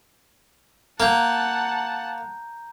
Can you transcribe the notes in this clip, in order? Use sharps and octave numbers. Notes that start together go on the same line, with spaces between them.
A#3 F#5 A5 A#5 G6